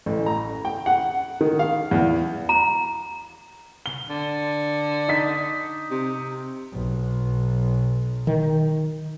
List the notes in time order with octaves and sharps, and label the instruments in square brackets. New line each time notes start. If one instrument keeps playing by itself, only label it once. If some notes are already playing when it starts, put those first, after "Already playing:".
[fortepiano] A1
A#5
G5
F#5
D#3
F5
E2
[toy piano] A#5
[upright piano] G7
[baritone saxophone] D3
[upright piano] D#4 B6
[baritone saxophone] C3
[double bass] B1
[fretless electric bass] D#3